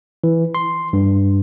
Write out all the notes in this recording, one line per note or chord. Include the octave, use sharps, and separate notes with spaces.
E3
C6
G2